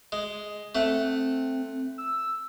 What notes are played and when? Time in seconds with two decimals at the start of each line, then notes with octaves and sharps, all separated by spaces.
0.12 G#3
0.75 A3 C4 F#5
1.98 E6